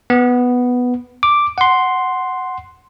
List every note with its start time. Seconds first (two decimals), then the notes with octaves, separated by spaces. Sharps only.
0.10 B3
1.23 D6
1.58 F#5 C6